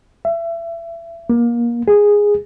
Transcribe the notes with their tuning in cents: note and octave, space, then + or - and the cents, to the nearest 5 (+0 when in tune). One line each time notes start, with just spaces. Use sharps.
E5 +30
A#3 +25
G#4 -10